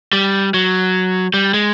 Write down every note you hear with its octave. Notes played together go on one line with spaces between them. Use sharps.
G3
F#3
G3
G#3